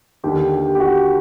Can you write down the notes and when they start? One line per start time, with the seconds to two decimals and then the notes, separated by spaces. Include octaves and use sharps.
0.24 D#2 D3 G4
0.52 G4
0.75 G4
0.80 F#4